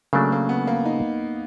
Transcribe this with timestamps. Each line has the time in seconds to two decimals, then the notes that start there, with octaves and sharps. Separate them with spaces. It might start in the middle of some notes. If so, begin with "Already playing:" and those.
0.13 C#3 F#3 A3 A#3 D4
0.32 A#3
0.49 B3
0.67 A#3
0.85 D#4